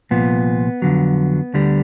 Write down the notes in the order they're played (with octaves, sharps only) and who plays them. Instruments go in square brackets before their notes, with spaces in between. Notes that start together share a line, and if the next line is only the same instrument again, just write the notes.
[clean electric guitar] C2 A#2 F3 B3
F2 D3 F#3
D2 D3 G3